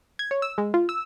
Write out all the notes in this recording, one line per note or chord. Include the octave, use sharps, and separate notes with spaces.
G#6
C#5
E6
G#3
F4
E6